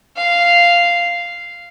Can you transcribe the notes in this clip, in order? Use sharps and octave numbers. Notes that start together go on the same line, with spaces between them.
F5